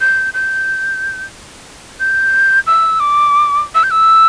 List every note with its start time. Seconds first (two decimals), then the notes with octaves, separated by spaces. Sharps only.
0.01 G6
0.34 G6
2.00 G6
2.67 E6
3.00 D6
3.75 E6
3.83 G6
3.91 E6